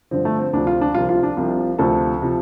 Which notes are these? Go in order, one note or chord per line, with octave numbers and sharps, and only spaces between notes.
G2 D3 F3 C4
A3
C4
D2 C3 F3 D4
F4
D4
C2 C3 F3 F4
F4
D4
C2 C3 F3 F4
D2 C3 F3 A4
C3 F3